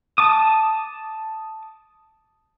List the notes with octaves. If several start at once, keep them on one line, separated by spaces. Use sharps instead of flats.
A5 D6 D#6